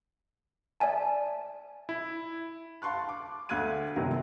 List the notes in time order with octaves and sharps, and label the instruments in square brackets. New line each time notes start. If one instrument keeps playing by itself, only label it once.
[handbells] D5 E5 G#5 A5
[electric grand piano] E4
[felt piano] F5 A5 C6 C#6 F#6
D6
D2 F5 F#6 G#6 D#7
G1 C3 D#3 F#3 A#4